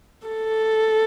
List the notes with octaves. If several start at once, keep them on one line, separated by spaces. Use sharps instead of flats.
A4